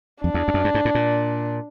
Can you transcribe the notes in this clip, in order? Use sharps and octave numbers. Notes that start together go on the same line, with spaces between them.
F2 D4
E2
F2
F#2
G2
G#2
A2
A#2